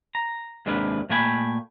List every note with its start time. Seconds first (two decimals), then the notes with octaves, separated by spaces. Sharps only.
0.15 A#5
0.66 D#2 C3 G#3 D4 A#4 B4
1.09 A#2 A3 A#3 G5 G#5 B5